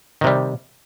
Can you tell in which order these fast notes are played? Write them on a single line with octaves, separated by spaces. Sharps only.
D#3 C3 G3